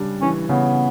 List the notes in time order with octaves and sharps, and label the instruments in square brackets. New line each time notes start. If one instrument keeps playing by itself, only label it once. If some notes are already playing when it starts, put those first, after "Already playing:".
Already playing: [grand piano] C#3 G3 D4
[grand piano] E3 [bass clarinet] C#4
[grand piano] C#3 [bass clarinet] B3